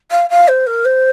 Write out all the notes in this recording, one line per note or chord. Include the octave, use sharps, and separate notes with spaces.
F5
F5
C5
A#4
C5